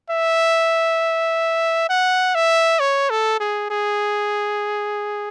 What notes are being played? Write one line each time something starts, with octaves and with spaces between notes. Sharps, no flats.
E5
F#5
E5
C#5
A4
G#4
G#4